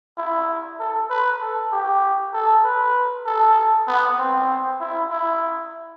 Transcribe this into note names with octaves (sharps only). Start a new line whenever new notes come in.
E4
A4
B4
A4
G4
A4
B4
A4
B3
C4
E4
E4